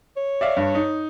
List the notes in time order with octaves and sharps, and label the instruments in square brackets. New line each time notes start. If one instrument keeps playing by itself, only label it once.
[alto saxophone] C#5
[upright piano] D5 E5 F5
G2
D#4